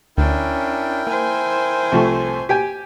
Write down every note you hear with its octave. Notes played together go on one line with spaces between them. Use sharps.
D2 C#4 D4 E4 A#4 G5
A#3 C5 G#5
C2 F3 A3
G4 G5 G#5